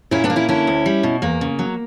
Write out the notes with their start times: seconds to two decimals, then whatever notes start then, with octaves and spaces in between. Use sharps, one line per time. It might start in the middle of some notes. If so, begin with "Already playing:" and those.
0.11 A#2 C#4 E4
0.24 B3 D4
0.30 A#3
0.36 C#4 E4
0.49 D3 C#4 E4
0.67 D2
0.86 G3
1.03 B2
1.22 E2 A#3
1.41 C#3
1.59 F#3